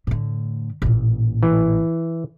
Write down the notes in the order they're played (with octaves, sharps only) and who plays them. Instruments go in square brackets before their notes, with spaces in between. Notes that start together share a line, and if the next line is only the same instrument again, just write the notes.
[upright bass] A2 D3
A1 A#2
[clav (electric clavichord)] E3